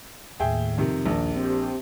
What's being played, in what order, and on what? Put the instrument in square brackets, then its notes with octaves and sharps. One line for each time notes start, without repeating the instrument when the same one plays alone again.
[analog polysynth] D#2 A2 [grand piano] G#4 E5 G5
[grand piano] F2 C3 D#3
[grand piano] A#1 A#3 D4 [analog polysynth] D#2
[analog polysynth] C4 G4 C5